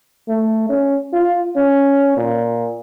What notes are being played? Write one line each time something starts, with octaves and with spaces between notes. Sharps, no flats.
A3
C#4
F4
C#4
A#2